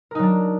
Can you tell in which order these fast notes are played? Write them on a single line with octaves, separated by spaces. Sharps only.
A#4 D#4 F#3 D4